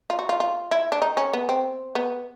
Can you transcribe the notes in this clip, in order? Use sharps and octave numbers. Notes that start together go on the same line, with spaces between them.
F4
F#4
F4
F4
E4
D4
D#4
C#4
B3
C4
B3